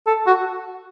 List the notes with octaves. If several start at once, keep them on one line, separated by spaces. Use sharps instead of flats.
A4
F#4